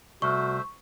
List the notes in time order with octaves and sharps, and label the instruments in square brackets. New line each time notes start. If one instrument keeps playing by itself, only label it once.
[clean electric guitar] C2 [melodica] A3 C5 E5 [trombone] F#4 [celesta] C#6